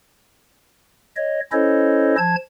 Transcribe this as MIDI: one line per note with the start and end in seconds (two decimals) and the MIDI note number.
1.16 1.40 73
1.16 1.40 75
1.52 2.15 61
1.52 2.15 64
1.52 2.15 69
1.52 2.15 72
1.52 2.15 73
1.52 2.15 75
2.18 2.35 53
2.18 2.35 81
2.18 2.35 92